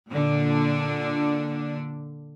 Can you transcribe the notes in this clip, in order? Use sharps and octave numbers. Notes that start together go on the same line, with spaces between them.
A#2 D3 D4